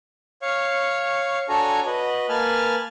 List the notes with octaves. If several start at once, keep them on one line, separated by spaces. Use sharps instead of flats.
C#5 F5 C#6
D4 F#4 A4 C#5 G#5 A#5
F#4 B4 D#5
A#3 B4 G#5 A5 F6